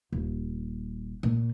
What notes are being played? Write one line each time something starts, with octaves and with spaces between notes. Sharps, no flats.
D#1
A#2